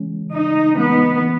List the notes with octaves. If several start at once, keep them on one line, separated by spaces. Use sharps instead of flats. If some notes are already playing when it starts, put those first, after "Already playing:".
Already playing: C#3 E3 G#3 C#4
C#3 D#4
E3 G#3 B3 C#4
E3